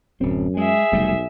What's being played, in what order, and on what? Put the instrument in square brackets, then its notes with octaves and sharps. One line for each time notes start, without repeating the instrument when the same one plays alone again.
[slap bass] D1 C4 [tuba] F#2
[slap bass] G#3 [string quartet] G#4 E5
[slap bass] F1 G3 A3 [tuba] B1